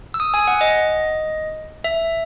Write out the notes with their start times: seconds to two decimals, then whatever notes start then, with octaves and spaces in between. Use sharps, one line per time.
0.14 E6
0.20 D#6
0.34 G#5
0.47 F#5
0.61 D#5
1.84 E5